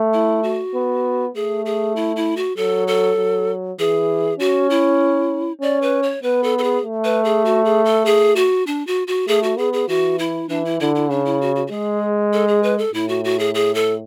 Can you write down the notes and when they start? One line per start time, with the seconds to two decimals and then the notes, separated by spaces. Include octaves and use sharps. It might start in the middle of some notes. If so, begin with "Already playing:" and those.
Already playing: A3
0.14 E4
0.43 F#4
0.75 B3
1.35 A3 G#4
1.66 G#4
1.96 E4
2.16 E4
2.37 F#4
2.57 F#3 A4
2.88 A4
3.17 F#3
3.79 E3 G#4
4.40 C#4 F#4
4.70 E4
5.61 C#4 D5
5.82 B4
6.03 C#5
6.23 B3 B4
6.44 A4
6.58 A4
6.63 G#4
6.84 A3
7.04 B4
7.25 G#4
7.45 F#4
7.65 G#4
7.85 A4
8.06 G#4
8.36 F#4
8.67 D4
8.87 F#4
9.07 F#4
9.27 A3 G#4
9.43 F#4
9.58 B3 G#4
9.73 G#4
9.88 E3 F#4
10.19 E4
10.49 E3 D4
10.65 E4
10.80 D3 E4
10.95 E4
11.10 C#3 D4
11.26 E4
11.42 F#4
11.56 F#4
11.67 F#4
11.71 G#3 G#4
12.33 A4
12.48 G#4
12.63 B4
12.78 A4
12.93 A2 E4
13.09 F#4
13.25 F#4
13.39 G#4
13.55 G#4
13.75 A4